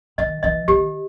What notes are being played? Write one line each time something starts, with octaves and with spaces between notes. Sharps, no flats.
D#3 D#5
E3 D#5
D#3 G4